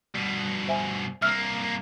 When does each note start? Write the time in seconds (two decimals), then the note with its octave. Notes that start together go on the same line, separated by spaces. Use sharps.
0.15 G2 B2
0.68 C5 E5 G#5
1.22 C2 A#3 E5 E6 F6